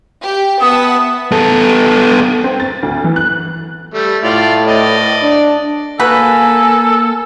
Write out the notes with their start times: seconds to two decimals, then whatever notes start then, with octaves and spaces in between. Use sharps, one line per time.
0.22 G4
0.61 B3 E5 F#5 A5 D#6
1.32 B3 A4
2.44 C4
2.60 A6
2.83 D2
3.04 E3
3.16 F#6
3.94 G3 A3
4.24 A2 F4 D5
4.68 D5 D#5
5.23 D4
6.00 A#3 F#4 A4 B4 G#5